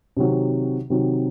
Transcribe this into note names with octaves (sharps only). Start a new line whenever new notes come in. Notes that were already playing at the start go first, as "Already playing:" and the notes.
C3 D#3 F#3 C4 F#4
C3 D#3 F#3 C4 F#4